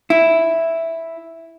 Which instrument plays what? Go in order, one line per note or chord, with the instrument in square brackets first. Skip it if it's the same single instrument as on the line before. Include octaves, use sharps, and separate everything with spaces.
[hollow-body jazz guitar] E4